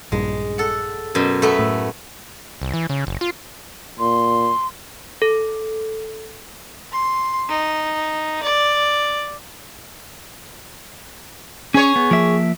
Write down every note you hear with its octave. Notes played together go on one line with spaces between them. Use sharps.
A#1 G2 G#3
A4 F#5
F#2 B2
A3 B3 E5
A2
C2
E3
C#3
F#1
F4
A#2 C6
A4
C6
D#4
D5
C#4 G#4 C#5
B3
F3 A#3 E5